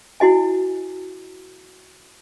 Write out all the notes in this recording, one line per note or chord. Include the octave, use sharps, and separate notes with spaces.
E4 F#4 D#5 G#5